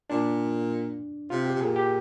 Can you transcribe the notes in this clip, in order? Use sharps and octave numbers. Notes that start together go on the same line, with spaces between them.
A#2 D4
C3 F4
G4
C3
A#2 G#4
G4